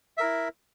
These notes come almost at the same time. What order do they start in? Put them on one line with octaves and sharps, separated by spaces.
E5 A#4 E4